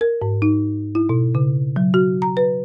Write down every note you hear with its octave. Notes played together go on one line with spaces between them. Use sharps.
A#4
G#2
D#4
E4
B2
C#3
F#3
F#4
A#5
B4